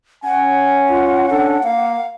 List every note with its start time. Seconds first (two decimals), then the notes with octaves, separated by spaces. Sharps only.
0.24 C#4 F#5 G#5
0.89 F4
1.30 D4 A4
1.63 A#3 F5